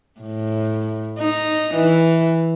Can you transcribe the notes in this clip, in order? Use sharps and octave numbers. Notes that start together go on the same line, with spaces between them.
A2
D#4
E3